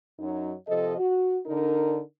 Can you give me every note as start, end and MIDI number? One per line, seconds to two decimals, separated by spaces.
0.20 0.52 42
0.20 0.52 54
0.20 0.52 63
0.68 0.98 48
0.68 0.98 53
0.68 0.98 69
0.68 0.98 75
0.98 1.38 66
1.46 1.99 50
1.46 1.99 62
1.46 1.99 63
1.46 1.99 70